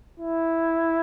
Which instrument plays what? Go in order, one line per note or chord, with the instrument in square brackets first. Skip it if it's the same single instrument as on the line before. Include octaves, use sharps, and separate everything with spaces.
[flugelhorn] E4